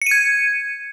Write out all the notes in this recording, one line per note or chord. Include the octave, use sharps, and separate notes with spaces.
G#6 C#7 D#7